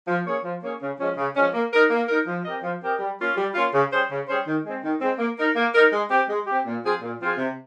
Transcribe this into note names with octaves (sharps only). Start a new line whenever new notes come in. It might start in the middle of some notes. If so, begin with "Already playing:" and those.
F3
A#3 C#4 G#4 C#5
F3
A#3 C#4 G#4 C#5
C#3
F3 G#3 C#4
C#3
F3 G#3 C#4
A#3
D#4 A#4
A#3
D#4 A#4
F3
C4 G4 A#4 D#5
F3
C4 G4 A#4 D#5
G3
A#3 C#4 F4
G3
A#3 C#4 F4
C#3
G3 C#4 G#4 C5
C#3
G3 C#4 G#4 C5
D#3
G#3 C4
D#3
G#3 C4
A#3
D#4 A#4
A#3
D#4 A#4
G#3
C4 G4
G#3
C4 G4
A#2
F3 C4 F4 G#4
A#2
F3 C4 F4 G#4
C3